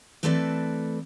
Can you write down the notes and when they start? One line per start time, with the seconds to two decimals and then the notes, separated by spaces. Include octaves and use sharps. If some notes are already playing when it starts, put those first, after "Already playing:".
0.23 E3 A3 C4 A4 B4 D5